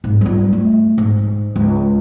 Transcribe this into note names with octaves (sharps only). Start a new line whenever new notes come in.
G#2
G3 F4
A3
G#2
C#2